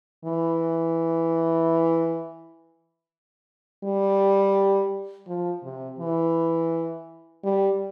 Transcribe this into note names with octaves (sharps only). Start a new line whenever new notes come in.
E3
G3
F3
C3
E3
G3